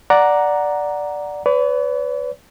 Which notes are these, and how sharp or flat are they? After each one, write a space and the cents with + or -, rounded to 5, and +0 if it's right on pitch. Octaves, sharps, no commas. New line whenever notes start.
D5 +0 F#5 +0 A#5 +0
B4 +20 D5 -45